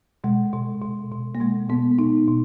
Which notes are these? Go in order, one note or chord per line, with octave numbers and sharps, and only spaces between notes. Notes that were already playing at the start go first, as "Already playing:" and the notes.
B2 G#3
B2
B2
B2
A#3
B2 G#3
B2 B3
B2 D#4
B2